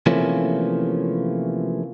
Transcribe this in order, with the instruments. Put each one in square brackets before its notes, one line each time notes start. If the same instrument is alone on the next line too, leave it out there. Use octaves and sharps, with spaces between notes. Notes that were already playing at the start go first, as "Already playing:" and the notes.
[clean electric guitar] C3 E3 F3 A3 A#3 C#4